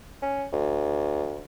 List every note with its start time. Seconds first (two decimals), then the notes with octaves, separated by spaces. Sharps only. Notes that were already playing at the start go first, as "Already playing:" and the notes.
0.22 C#4
0.52 D2